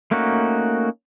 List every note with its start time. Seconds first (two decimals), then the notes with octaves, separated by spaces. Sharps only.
0.11 A3 A#3 C#4 D#4 F#4